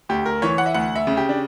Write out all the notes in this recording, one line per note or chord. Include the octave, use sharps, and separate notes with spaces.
D2 G4
A#4
E3 C#5
F#5
E5
D2 F#5
E5
C#3
G4
D4